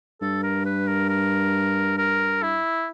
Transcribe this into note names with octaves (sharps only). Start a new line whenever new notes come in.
G2 A4
A#4
B4
A#4
A#4
A#4
E4